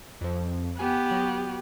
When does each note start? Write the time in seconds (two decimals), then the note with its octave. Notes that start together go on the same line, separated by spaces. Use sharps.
0.21 F2 F3
0.77 B3 G4 G#5 F#6
1.11 F#3 F#4